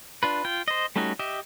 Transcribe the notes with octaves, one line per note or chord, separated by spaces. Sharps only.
D4 F4 B4
F4 G5
C5 D#5
G3 A3 C#4 D#4 F#4
G4 D#5 E5